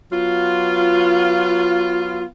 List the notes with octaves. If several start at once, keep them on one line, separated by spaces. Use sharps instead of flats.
F#3 B3 F4